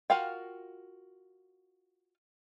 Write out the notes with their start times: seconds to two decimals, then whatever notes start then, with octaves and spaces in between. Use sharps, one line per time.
0.10 F4 F#4 A#4 F5 G5